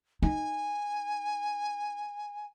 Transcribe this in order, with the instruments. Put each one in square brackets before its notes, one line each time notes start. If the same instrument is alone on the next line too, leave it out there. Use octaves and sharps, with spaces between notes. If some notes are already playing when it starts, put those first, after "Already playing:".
[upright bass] D#4 [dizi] G#5